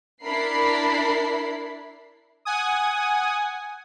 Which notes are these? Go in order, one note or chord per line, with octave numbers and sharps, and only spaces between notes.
D4 E4 A#4 B5 C7
F#5 G#5 D#6